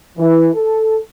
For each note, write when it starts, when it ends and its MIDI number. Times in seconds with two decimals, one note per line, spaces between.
0.18 0.49 52
0.55 0.98 69